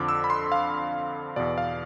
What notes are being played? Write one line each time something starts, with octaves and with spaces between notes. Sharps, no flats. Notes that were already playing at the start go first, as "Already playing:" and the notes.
Already playing: F2 D3 F3 D6
E6
B5
C6
F5
E2 B2 D5
F5